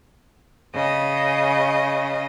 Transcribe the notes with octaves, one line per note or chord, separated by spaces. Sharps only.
C#3 D#5